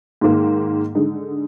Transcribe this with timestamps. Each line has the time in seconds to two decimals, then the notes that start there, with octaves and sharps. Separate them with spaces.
0.21 G#2 D#3 A#3
0.95 D3 G#3 D#4